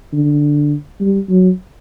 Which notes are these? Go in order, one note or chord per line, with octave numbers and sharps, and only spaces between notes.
D3
G3
F#3